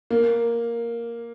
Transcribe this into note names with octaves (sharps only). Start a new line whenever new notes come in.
A#3